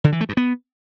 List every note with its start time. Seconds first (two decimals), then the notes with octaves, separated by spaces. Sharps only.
0.04 D3
0.12 E3
0.21 A3
0.29 G2
0.37 B3